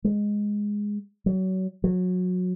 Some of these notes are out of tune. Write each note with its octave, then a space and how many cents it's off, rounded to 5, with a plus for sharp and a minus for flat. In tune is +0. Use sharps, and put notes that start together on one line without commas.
G#3 -5
F#3 +25
F#3 -25